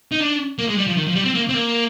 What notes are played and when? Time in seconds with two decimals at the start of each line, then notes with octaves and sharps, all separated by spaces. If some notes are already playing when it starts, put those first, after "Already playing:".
0.12 D#4
0.21 D4
0.58 A#3
0.68 G#3
0.78 G3
0.87 F3
0.97 D#3
1.06 F3
1.16 G3
1.25 C4
1.35 A#3
1.49 C4
1.54 A#3